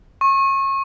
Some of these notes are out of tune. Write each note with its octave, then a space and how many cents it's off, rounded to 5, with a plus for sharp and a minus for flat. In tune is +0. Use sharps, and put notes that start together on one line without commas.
C#6 -30